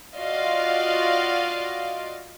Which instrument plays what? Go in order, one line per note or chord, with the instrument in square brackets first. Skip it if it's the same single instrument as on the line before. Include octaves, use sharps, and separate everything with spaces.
[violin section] F4 F#4 D5 D#5 F5